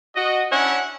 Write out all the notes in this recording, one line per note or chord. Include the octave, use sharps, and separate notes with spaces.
F#4 D#5
C#4 D4 E4 C#5 F#5